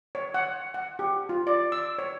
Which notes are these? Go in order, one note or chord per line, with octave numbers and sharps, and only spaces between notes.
C#5
F#5
F#5
G4
F4
D5
E6
C#5